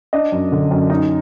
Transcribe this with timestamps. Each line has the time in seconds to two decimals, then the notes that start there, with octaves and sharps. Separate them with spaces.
0.13 D4 D#5
0.32 F#2
0.52 D3
0.71 F#2
0.90 D#4